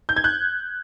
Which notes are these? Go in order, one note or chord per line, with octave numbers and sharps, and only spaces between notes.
G6
G#6
F#6